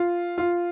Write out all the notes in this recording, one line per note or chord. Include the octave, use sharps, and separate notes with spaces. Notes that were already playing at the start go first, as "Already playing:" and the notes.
Already playing: F4
F4